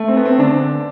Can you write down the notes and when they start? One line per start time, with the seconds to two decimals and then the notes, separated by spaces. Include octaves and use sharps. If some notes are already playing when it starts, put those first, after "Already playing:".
Already playing: A3
0.08 C4
0.17 B3
0.25 C4
0.38 D3 D4